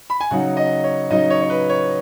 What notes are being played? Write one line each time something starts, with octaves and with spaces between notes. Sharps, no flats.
B5
G#5
C#3 F#3 D#4 F#5
D#5
C#5
C#3 F#3 D#4 D#5
C#5
C#5
B4
C#5